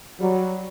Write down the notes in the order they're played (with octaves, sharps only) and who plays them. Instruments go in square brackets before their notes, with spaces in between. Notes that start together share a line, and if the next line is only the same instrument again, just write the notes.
[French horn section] F#3 [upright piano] G3